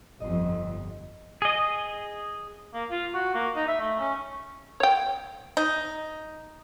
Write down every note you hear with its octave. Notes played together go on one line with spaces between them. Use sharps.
G1 F2 D#5 C6
G#4 D#5
A#3
F4
F#4
A#3
D#4
E5
A3
C#4
C#5 G5
D#4